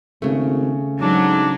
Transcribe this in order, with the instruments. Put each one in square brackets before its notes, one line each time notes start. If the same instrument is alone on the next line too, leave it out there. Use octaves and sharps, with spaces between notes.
[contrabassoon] G#1 [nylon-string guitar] C#3 A3
[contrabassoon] G#2 [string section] F#3 [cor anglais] D4